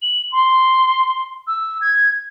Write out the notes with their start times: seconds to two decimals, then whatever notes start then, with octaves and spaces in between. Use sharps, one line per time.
0.02 F#7
0.32 C6
1.47 E6
1.81 G#6